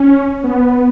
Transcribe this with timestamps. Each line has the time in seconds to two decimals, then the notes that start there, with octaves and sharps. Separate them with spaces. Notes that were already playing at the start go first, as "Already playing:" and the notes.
Already playing: C#4
0.44 B3